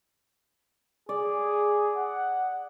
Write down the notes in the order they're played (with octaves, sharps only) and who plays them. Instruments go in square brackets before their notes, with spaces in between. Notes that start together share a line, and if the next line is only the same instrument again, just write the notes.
[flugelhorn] G#4 [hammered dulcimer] D5
[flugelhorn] F#5